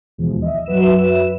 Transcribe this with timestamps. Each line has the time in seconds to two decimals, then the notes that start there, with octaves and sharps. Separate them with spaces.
0.18 G#1 D#2 B2 E3 F3 G#3
0.42 D#5 E5
0.66 F#2 F#3 F#4 B4 E5 E7